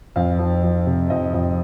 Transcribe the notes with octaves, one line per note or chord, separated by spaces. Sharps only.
F2 F5
F3
F3
C3
F2 D#5
F2